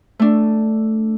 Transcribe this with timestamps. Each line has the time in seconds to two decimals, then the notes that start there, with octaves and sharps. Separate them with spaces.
0.19 A3 D4